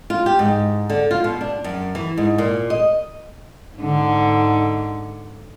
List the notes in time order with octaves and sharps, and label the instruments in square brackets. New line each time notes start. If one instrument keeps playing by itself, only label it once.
[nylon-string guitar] F4
G4
G#2
D3
F4
B2
D4
F#2
E3
G#2
A#2
D#5
[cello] G#2 D3